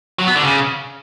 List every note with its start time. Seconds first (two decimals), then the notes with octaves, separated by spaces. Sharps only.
0.19 F#3
0.27 B3
0.35 D3
0.44 C#3